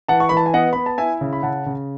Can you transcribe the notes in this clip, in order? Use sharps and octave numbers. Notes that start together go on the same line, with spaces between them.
E3 F#5 A5
C#6
E3 B5
A5
G#5
B3 D#5 F#5
B3 B5
A5
E4 E5 G#5
C#3
B5
C#3 F#5 A5
C#3